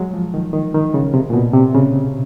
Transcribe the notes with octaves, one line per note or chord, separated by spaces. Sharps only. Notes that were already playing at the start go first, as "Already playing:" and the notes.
Already playing: F#3 G#3
F3
D#3
D#3
D#3
C#3
C3
A#2
B2
C3
C#3